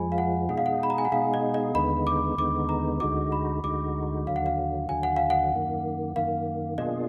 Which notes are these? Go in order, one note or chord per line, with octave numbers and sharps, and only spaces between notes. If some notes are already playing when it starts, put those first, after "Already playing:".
Already playing: F2 F3 G#3 G#5 B5
F5
F#5
B2 G#3 D#4 G#4 F#5
F5
F#5
B5
A#5
G#5
F#5
B2 G#3 D#4 G#4 F5
D#5
D#5
D#2 D3 G#3 B3 D#4 B5
D6
D#2 D3 G#3 B3 D#4 D6
A#5
D2 D3 G#3 D#4 F#4 D6
B5
D2 D3 G#3 D#4 F#4 D6
D#2 D3 F#3 F5
F#5
F5
D#2 D3 F#3 G#5
F#5
F5
F#5
F#2 D#3 A#3
F#2 D#3 A#3 F5
B2 A#3 D4 F4 G#4 D#5